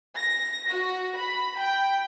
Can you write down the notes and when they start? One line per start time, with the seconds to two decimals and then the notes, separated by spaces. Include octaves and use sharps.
0.18 A#6
0.71 F#4
1.18 B5
1.60 G5